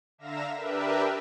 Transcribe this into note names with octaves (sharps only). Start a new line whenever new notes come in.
D3 E5 F5 A#5 A#6 E7
D4 G4 A#4 B4 E5